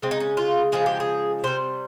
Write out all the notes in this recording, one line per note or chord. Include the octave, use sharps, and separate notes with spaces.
C#3 G#3 C4
D#4
C#4
F4
C#3 F3 G#3 G#4
G4
G#4
C3 G3 C5